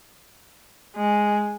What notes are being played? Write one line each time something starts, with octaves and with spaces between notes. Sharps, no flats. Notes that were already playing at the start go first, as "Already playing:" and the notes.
G#3